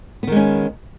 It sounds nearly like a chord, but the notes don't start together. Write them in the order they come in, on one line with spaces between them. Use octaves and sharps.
B3 D#3 G#3 C#4